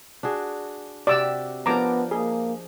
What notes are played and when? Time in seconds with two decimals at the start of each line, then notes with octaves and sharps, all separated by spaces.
0.23 D4 F#4 G#4
1.07 C3 F#4 G4 D5 D6 E6
1.66 F3 B3 D4 A#4 A#5 D6
2.11 A#3 G#4